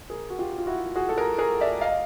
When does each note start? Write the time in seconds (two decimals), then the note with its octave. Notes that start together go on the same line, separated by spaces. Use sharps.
0.10 G#4 A#4
0.30 F#4
0.39 F4 G4
0.58 F4
0.67 E4 F#4
0.95 F#4 G#4
1.09 A4
1.18 G#4 A#4
1.38 G#4 A#4
1.61 D5 E5
1.81 D#5 F5